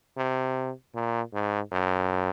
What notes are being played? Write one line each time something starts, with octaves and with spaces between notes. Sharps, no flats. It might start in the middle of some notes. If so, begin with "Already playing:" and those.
C3
A#2
G#2
F#2